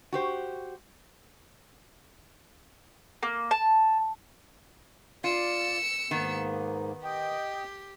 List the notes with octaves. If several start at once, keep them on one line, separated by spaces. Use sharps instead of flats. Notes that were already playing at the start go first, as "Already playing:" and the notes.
F#4 G4 C5
A#3
A5
F4 D5 E6 C#7
G#2 D#3 A#3 B3
G4 D#5 G5